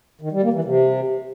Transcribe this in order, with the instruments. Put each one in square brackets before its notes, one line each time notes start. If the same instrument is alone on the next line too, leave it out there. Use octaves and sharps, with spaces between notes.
[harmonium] D#3
G3
A#3
E3
C3